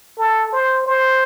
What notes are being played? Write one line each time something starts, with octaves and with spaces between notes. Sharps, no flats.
A4
C5
C5